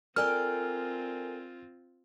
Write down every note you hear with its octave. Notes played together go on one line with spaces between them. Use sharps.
C4 F4 A4 A#4 D5 G5 G#5 F6